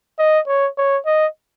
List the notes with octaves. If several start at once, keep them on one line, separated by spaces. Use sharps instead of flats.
D#5
C#5
C#5
D#5